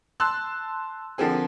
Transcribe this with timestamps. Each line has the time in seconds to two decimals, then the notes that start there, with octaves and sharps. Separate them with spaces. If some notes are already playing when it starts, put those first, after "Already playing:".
0.20 A5 C6 E6 F#6
1.18 D3 F3 A#3 C4 G#4